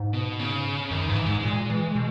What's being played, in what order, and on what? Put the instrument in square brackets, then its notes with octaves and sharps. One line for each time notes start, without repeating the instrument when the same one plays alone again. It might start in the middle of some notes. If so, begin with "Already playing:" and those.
Already playing: [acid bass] G#2
[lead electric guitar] B2
C#3
[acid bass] F#2 [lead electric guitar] D#3
[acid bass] G#2 [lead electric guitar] E3
[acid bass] G#2 [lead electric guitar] G#3
[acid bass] A#2
E3
B2